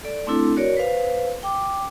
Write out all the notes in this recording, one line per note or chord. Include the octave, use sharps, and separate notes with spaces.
A4 D5
A3 C4 D4 E4 A4
F#4 A#4 C#5 D5
B4 C5 F5
G5 D6